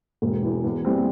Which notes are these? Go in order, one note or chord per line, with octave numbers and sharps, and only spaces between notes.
E1
E2 E3
E2
E3 G3 C4